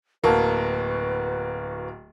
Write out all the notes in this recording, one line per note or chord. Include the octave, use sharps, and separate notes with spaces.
D1 A#3 F#4 A#4 B4 A5